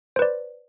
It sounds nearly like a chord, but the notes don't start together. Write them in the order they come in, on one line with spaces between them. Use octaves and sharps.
C5 B4 D5